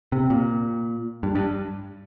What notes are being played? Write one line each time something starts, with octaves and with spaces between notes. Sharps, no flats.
C3
A#2
G2
G2